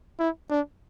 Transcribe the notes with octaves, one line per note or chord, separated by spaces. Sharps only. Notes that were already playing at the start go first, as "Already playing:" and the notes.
E4
D4